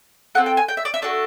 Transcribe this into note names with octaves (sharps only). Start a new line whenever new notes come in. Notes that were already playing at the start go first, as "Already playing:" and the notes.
C4 F4 A4 F#5
G5
G#5
G5
E5
D5
E5
A3 D4 F#4 A4 D5